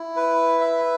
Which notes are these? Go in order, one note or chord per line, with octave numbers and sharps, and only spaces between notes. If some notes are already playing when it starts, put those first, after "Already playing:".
Already playing: E4
B4
E5